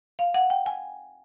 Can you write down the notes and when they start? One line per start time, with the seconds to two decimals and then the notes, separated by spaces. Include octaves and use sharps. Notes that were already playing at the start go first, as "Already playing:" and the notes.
0.19 F5
0.34 F#5
0.50 G5
0.66 G#5